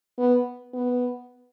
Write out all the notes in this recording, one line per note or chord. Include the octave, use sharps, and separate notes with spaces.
B3
B3